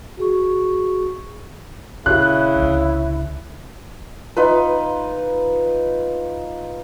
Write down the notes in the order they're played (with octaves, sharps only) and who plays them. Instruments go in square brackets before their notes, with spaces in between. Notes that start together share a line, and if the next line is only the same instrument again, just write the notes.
[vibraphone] F#4 G#4 C#6
[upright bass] A#2 [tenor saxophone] C#3 [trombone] E4 [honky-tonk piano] F#6
[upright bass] C#2 D3
[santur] D#4 F4 B4